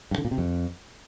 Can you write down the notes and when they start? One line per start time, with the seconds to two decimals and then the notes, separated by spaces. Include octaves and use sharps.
0.11 G2
0.18 D3
0.25 A#2
0.31 C3
0.38 F2